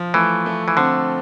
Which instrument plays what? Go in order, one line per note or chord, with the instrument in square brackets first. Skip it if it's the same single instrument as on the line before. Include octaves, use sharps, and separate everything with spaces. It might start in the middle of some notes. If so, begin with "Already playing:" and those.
Already playing: [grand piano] F3
[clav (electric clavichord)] E3 [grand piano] A3
[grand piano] A3
[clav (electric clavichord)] E3
[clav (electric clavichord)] D3 [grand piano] C4